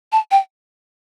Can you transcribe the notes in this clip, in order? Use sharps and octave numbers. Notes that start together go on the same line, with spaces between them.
A5
G5